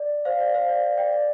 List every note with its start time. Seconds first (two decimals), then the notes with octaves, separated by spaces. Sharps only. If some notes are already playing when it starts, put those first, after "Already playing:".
Already playing: D5
0.25 C5 F5
0.40 D5
0.54 C5 F5
0.69 D5
0.84 D5
0.98 D5 G5
1.13 D5